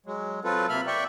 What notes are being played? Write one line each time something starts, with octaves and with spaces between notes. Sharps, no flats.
F#3 G#3
F#3 C4 F4 A4 B4
C3 A#3 E5 B5 F6
D5 E5 G5 C#6